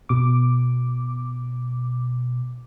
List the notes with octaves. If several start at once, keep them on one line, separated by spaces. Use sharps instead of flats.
B2 D6